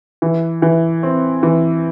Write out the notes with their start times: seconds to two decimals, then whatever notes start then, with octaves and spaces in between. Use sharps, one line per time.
0.22 E3
0.62 E3
1.03 C4
1.43 E3